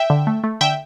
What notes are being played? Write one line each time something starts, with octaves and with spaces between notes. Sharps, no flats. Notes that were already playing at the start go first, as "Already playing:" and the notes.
Already playing: E5 G5
D3
A3
A3
D3 E5 G5